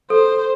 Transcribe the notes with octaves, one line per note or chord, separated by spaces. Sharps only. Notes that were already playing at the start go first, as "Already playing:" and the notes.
A4 C5